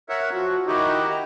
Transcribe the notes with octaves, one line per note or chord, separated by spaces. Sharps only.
A#4 C#5 E5 F#5
F3 F#4
D#3 D#4 E4 F#4 G4
A#5